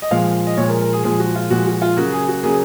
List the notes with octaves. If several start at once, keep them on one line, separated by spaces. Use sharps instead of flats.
D#5
A#2 F3 G#3 F5
D#5
A#2 F3 G#3 C#5
A#4
A#4
G#4
A#2 F3 G#3 G#4
F#4
F4
A#2 F3 G#3 F#4
F#4
F4
C#3 F#3 A#3 F#4
G#4
F#4
C#3 F#3 A#3 G#4